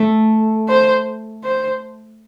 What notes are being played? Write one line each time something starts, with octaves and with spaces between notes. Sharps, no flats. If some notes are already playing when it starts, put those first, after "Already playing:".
Already playing: A3
C5
C5